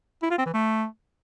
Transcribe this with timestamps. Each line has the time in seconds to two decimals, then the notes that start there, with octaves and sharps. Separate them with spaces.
0.23 E4
0.31 F4
0.38 C4
0.46 E3
0.54 A3